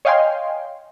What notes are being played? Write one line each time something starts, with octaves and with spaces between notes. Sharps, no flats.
C#5 D#5 F5 G5 G#5 C6